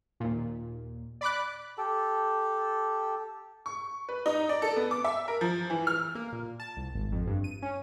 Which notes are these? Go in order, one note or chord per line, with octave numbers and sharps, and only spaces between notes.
D#2 A#2
D5 B5 D6 F#6
G4 A4
C#6
B4
D#4
D5
A4
B3
D6
E5
A#4
F3
E3
F6
A#3
A#2
A5
C2
G#1
F2
G2
D#7
C#4